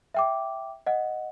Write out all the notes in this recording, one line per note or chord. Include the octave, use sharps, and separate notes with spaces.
E5 G5 D6
D#5 F#5